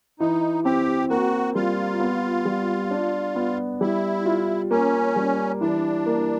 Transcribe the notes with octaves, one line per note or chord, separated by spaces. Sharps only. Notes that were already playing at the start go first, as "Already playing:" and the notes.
E3 D#4
C4 G4
A#3 F#4
G3 F4
B3
G3
D4
B3
G3 E4
F4
A#3 C#4
G3
E3 D4
A#3